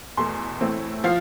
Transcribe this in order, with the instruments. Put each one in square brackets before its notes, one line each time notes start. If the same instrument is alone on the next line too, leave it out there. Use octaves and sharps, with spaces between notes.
[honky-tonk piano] E2 B2 A3 C6
A2 E3 A3 C4
F3 F5